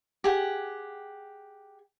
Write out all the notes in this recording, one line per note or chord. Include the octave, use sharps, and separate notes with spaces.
G4 G#4 F#5